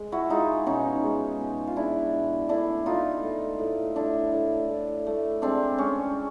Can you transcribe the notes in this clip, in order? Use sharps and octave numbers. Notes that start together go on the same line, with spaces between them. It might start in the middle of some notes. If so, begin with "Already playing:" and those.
Already playing: G#3
E4 F#4
G#3 D#4 F4
B2 C#4 D#4
G#3
B2
F4
G#3 D4 E4
B2
A3 D4 E4
A3 D#4 F4
A3
A2
A2 D4 E4
A2
A2
A3
G#3 C4 D4
G#3 C#4